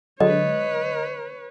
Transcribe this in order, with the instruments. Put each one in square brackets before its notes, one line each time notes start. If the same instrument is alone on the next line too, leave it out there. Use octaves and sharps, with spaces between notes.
[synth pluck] D3 F#3 G#3 [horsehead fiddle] B4 C#5 [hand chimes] D#5